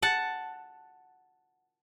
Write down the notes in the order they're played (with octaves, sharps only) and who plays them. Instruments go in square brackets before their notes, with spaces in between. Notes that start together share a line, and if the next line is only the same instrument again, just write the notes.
[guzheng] F#5 A5